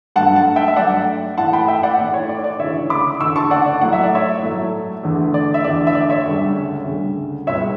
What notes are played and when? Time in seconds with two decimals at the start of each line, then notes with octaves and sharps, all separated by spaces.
0.16 G2 F#3 A3 F#5 A5
0.36 F#5 A5
0.56 E5 G5
0.68 E5
0.76 G2 F#3 A3 D5 F#5
1.37 A2 E3 A3 F#5 A5
1.53 G5 B5
1.68 E5 G5
1.83 D5 F#5
1.98 A2 E3 A3 D5
2.14 C#5
2.29 D5
2.44 D5
2.60 D2 C#3 E3 C#5 E5
2.90 B5 D6
3.20 D2 C#3 E3 C#6 E6
3.36 A5 C#6
3.51 D5 F#5
3.66 D5
3.81 A2 F#3 A3 F#5
3.93 E5
4.04 D5
4.15 C#5 E5
4.42 A2 F#3 A3
5.03 E2 D3 A3
5.34 D5
5.54 E5
5.64 E2 D3 A3 D5
5.87 E5
5.95 D5
6.10 C#5 E5
6.26 D2 C#3 G3
6.86 D2 C#3 G3
7.47 C#2 B2 G3 C#5 E5